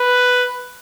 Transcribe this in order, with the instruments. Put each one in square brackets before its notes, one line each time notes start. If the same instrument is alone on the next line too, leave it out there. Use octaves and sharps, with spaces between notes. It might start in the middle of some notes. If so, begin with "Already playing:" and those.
Already playing: [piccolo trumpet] B4